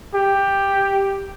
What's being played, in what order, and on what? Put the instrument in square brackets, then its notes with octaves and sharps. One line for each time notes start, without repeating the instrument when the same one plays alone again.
[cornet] G4